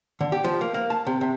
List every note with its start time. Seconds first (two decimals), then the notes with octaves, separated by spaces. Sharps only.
0.21 D3
0.32 G4
0.44 F3
0.61 A#3
0.74 A#3
0.90 A5
1.07 C3
1.21 C3